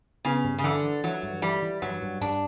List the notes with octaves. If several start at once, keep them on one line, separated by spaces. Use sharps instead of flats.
C#3 B3
G2
C#3
D3 E3
E3
E3 F#3
G2
E3 G3
E3
G2 F#3
G2
G2 D4